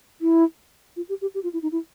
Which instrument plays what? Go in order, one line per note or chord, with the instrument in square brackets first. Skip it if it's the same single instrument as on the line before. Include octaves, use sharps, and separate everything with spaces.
[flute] E4
F4
G4
G4
G4
F4
E4
D#4
E4